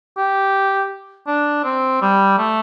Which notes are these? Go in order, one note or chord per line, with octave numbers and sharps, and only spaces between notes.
G4
D4
C4
G3
A3